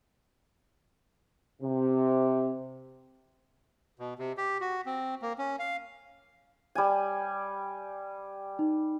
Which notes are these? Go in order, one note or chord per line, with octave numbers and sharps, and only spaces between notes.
C3
B2
C3
G4
F#4
C4
A#3
C#4
F5
G3 G#5
D#4